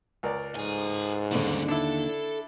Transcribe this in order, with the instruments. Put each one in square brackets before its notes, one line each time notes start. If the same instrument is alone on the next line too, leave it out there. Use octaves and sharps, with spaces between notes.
[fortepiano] C#2 A#4 D5
[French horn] G#2 [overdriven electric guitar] A4 G#5
[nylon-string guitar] D#2 D3 [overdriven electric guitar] G3 C#4
[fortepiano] D4 E4 [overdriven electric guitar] A4